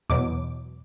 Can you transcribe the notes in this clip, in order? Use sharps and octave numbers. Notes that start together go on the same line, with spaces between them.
E2 B2 F#3 D6